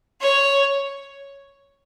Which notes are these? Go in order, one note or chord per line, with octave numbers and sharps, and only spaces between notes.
C#5